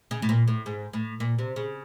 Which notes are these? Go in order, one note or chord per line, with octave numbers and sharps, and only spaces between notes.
C#3
A2
A#2
A2
G#2
A2
A#2
C3
C#3